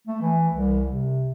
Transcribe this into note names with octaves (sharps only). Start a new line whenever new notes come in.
A3
E3
C2
C3